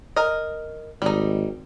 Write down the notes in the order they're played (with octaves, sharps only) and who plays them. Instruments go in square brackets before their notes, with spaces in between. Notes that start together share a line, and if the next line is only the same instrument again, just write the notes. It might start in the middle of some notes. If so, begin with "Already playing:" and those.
[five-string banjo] A#4 D#5
[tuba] G#1 [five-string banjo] G3 D#4